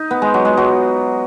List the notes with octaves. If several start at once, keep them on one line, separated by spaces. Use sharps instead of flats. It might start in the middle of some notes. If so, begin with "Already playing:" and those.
Already playing: D#4
B3
G#3
F#3
G#3
F#3